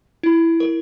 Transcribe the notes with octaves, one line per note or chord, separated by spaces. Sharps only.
E4
A#4